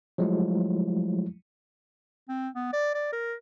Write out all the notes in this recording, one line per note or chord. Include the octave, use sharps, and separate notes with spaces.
F3 F#3 G#3 A3 E4
C4
B3
D5
D5
A#4